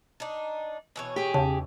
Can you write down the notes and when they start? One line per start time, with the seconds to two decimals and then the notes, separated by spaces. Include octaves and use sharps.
0.20 D4 D#4
0.96 B2 E3 C#5
1.16 G4 G#4
1.34 E2 C#3 A5